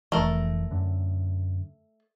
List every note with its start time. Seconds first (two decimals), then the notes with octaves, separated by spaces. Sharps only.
0.12 F1 E3 A3 A#4
0.71 F#2 D3